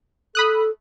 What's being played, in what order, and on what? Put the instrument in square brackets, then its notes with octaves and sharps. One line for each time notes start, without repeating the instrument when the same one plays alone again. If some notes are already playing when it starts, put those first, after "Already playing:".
[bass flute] A4 [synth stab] B5 D#6 F#6